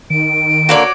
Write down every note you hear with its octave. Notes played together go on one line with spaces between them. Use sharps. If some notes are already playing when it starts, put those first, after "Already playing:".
D#3 D7
D3 A#3 F#4 C#5 D5